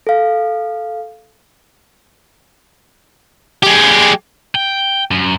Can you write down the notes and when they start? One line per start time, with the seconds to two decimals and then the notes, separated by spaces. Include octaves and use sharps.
0.07 A4 F5
3.63 G#3 G4
4.55 G5
5.11 F#2